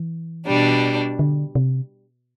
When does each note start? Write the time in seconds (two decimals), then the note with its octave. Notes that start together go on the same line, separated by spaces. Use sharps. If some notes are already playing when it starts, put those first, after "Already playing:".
Already playing: E3
0.47 B2 G3 D4
1.19 D3
1.55 C3